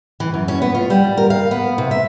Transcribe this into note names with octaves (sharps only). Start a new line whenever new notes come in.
E3
F#2
C#4
B3
F4
G3
A#4
F5
B3
C3
E5